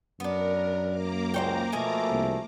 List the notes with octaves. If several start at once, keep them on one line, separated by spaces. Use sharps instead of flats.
F#2 B3 D4 A#4
A#3 A#5 D6
C#2 C5 C#5 G5
B2 F3 A3 G#5
C2